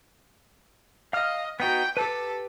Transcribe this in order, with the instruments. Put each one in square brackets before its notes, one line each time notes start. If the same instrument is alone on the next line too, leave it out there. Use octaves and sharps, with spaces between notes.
[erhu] D#5 [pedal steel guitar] F5 F6
[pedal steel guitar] B3 D#4 F#4 [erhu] G5
[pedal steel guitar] G4 B4 [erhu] A4